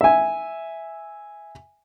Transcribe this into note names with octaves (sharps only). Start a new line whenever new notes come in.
E5 G#5